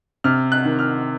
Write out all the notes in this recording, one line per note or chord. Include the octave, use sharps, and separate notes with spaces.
C3 F6
F#6
D#3
F6